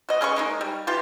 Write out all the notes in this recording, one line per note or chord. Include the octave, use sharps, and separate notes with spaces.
F#4 D#5
C#4 G#4 E5 C#6
G#3 A#3 D#4
G3
E3 F4 G4